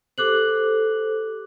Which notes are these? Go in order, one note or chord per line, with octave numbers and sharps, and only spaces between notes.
G4 A4 C5 D6 F#6 F#7